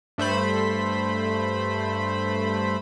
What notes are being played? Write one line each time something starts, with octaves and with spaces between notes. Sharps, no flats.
G2 A3 C5 B5